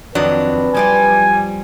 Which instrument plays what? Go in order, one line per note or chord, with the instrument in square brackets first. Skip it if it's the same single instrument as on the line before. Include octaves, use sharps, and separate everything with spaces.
[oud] F2 D#3 [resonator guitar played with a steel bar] F#3 D4 [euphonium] B4
[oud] F3 G3 D5 [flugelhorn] G#5